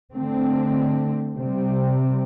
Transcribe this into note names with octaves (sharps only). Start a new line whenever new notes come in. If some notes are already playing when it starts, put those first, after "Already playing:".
D3 A3 C4
C3 G3 C4